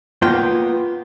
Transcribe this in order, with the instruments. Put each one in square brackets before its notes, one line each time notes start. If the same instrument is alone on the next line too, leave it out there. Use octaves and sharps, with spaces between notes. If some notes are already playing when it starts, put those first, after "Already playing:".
[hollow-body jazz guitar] A#3 B3 F4 G5